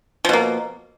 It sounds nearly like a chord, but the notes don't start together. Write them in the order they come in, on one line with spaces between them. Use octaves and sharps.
F3 B2 A#3